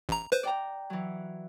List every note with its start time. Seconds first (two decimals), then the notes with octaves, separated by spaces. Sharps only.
0.09 A1 A#5
0.32 B4 C5
0.43 D5 G5 A#5
0.90 E3 F#3